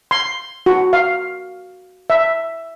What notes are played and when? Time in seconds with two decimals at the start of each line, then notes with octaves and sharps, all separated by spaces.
0.11 C6
0.66 F#4
0.93 F5
2.10 E5